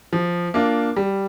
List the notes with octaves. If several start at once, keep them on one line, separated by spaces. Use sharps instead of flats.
F3
A#3 D4 F4
G3